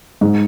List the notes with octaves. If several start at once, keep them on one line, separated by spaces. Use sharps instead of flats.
G#2